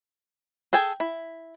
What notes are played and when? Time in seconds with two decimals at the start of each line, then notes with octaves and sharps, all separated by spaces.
0.73 G#4 A4 G5 G#5
1.00 E4